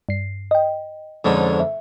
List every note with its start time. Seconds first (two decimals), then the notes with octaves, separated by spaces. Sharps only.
0.09 G2 C7
0.51 D#5 G5
1.25 F2 G#2 D3 C#4
1.60 E5